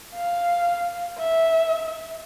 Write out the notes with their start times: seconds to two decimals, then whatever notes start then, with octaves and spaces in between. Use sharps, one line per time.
0.15 F5
1.18 E5